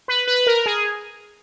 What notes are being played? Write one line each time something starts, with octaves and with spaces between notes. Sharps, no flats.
B4
B4
A#4
G#4